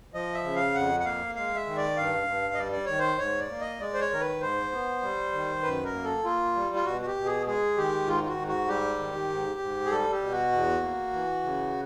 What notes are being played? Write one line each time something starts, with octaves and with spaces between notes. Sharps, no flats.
F3 D#5
E5
C#3
F5
F2 F#5
F#5
A#3 F5
G#3 F5
E5
D#3
D5
G2 F5
G2
D#5
G3 D5
D5
D#3 C#5
C5
G#2 C#5
D5
A#3
D#5
G#3 D5
C5
C#5
D#3 A#4
B4
G#2 C5
B3
G3
D#3
F#2 B4
A#4
A#3
A4
A#3 F4
G3
F4
B2 F#4
F#4
G4
B2
G#4
G#3 G#4
D#3 G4
G#2 F4
F4
F#4
G#2
F#4
G3 G4
D#3
G#2
G#2
G#4
G3 A4
G4
B2
F#4
E2
A#3
E3
C#3